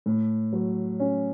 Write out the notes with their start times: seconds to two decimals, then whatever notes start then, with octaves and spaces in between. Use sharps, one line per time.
0.06 A2
0.53 F#3
1.00 C#4